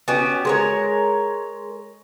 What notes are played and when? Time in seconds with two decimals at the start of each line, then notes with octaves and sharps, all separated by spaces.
0.08 B3 C#4 F#4 G4
0.45 G#3 A#4 C#5